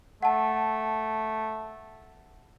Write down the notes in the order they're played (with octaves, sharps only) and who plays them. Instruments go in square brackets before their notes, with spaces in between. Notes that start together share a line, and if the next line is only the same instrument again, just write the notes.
[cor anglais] A3 [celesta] F#5 A5